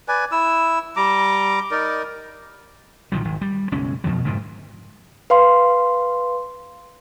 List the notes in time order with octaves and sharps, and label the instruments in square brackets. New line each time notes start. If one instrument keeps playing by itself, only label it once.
[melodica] B4 D5 G#5
E4 E6
G3 A#5 D6
D#4 A#4 D5
[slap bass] A#1 D#3 F3 F#3
G#1
G3
F#1 B1 G#3 C#4
F2 B2 F3 F#3
F#1 F2 G#2 B2
[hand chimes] B4 F5 C6